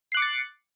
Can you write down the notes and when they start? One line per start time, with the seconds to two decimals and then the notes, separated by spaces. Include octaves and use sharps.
0.12 C7
0.14 F#6
0.17 D6
0.20 C#7
0.22 A6